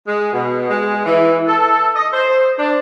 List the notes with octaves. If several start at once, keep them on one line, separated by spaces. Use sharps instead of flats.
G#3
B2
G#3
E3
A4
D#5
C5
D4